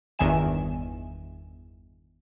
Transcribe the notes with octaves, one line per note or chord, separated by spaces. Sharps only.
G1 E2 D#3 E5 G#5 E7